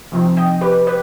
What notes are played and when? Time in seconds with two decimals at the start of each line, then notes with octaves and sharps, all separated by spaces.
0.12 C3 F3 C4 D#4
0.37 D#5 G5
0.61 G4 B4
0.87 G4 B4